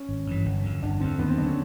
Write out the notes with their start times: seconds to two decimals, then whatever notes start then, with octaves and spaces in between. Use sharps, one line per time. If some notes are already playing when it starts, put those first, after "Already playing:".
Already playing: C#4
0.09 G#1
0.27 G2 E3
0.45 G1
0.64 F2 D3
0.82 G1 D4
1.00 F2 D3 C4
1.19 D#2 B3
1.28 C4
1.38 D3 F#3 D4
1.46 C#4